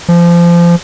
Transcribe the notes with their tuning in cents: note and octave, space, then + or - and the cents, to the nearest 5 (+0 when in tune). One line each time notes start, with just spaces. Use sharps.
F3 -25